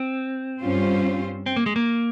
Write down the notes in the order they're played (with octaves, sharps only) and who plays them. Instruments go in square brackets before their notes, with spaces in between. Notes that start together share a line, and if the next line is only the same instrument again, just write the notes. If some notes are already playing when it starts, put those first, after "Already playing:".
Already playing: [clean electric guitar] C4
[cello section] G2 G3 C#4 F4 C5
[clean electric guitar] C4
A#3
G#3
A#3